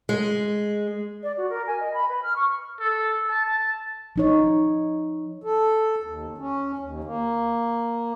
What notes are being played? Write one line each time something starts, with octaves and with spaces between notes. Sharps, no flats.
G#3
D5
F#4
A#4
G#5
D#5
B5
B4
F6
C#6
A4
A5
F3 D#4 C#5
A4
D#2
C#4
D#2
A#3